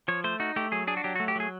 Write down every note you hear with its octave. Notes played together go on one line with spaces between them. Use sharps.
F3 C#5
A3 C5
D#4 F#4
A3 G4
F#3 G#4
D4 G#4
F#4
F#3 G4
F#4
A3
G4
F#3 G#4